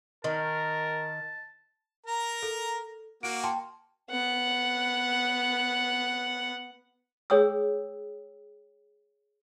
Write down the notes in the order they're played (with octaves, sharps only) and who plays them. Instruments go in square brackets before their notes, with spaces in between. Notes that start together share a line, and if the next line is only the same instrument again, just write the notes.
[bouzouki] D#3 [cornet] A#4 [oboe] A5
[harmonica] A#4 A#5
[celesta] A4
[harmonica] A#3 F#4 [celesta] D7
[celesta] G5 A5 C6
[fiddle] B3 F#5
[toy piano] G#4 C#5 G5 D#6 E6